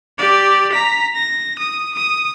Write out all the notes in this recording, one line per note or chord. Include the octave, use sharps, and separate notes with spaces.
G4 D5
A#5 B6
A#6
D#6
D#6